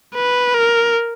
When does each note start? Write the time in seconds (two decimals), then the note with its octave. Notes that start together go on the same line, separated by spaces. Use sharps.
0.15 B4
0.55 A#4